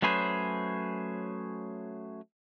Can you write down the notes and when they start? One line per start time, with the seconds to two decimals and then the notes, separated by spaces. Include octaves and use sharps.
0.02 F#3 A3 C#4 G#4 B4 C5